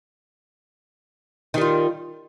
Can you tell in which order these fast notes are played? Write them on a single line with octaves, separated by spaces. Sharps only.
D#3 G3 F4